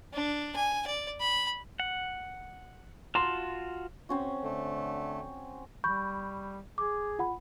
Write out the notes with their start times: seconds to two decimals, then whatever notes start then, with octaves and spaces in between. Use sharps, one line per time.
0.13 D4
0.55 G#5
0.87 D5
1.20 B5
1.80 F#5
3.15 F4 F#4 A5 C6
4.09 C4 C#4 F#4
4.44 D3 A3
5.84 G3 B5 C#6 G6
6.78 G#4 D6
7.19 F4 F#5 B5